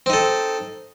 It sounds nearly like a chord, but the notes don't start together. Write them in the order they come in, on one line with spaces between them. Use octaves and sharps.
C4 D#4 A4